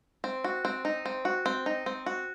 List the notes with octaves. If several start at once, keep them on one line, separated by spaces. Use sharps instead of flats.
C4
F#4
C4
D#4
C4
F#4
C4
D#4
C4
F#4